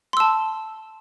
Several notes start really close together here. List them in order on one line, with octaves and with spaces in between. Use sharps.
C6 E6 A5